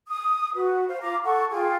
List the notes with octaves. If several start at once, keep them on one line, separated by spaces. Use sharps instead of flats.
D#6
F#4 B4
C5 F5
F4 A#5 D6
A4 F#5 C#6
F4 G#4 G5